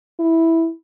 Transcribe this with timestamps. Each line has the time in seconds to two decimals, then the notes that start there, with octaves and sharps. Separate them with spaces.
0.20 E4